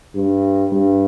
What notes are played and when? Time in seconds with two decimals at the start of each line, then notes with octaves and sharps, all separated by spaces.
0.15 G2
0.72 G2